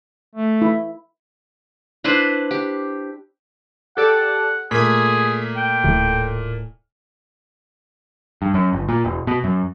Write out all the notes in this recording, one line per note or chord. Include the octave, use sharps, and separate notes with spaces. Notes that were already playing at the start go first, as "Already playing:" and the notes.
A3
E4
D4 E4 B4 C5
G4
G4 A4 D5 F#5
A#2 A3 G#4 G#6 B6
G5
D1 A2
G2
F#2
G1
A#2
E1
B2
F#2